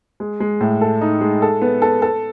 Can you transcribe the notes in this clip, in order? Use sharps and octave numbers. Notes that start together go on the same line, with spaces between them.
G#3
G#3
A2
A4
D#4
G#3
A4
B3
A4
A4